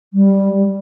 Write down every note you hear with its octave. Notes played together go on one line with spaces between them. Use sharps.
G3